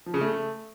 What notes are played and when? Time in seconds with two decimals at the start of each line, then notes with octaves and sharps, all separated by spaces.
0.06 F3
0.14 C#3
0.21 A3